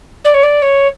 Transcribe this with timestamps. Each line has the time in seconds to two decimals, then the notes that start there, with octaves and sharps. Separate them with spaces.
0.24 D5
0.34 C#5
0.43 D5
0.62 C#5